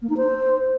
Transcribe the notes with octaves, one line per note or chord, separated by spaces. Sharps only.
A#3
D#4
C5